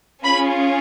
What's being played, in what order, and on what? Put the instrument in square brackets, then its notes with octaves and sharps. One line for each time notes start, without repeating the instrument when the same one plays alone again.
[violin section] C#4 F4 G#4 B5